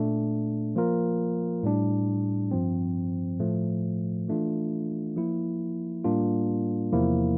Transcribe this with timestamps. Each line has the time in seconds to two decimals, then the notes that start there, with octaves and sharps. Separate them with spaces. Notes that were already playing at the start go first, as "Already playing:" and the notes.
Already playing: A#2 A3 D4
0.76 F3 A#3 F4 A#4
1.63 A2 G3 D4
2.51 G2 F3 C4
3.40 A2 F3 A3
4.28 E3 A3 D4 F4
5.16 F3 A#3 E4
6.04 A2 G3 A#3 D4 F4
6.92 E2 C3 F3 A#3 E4